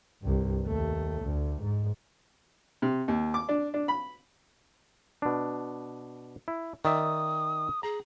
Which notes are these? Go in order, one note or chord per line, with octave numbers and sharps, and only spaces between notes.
C2 G2
D#2 A3
D2
G#2
C3
D#2
D6
D4
D4
B5
B2 D4
E4
D#3 D5 E5 D#6
G#4 A#5